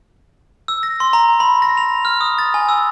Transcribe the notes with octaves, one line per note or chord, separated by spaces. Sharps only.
E6
A#6
C6
A#5
B5
A#6
F7
F6
D#6
A6
G#5
E6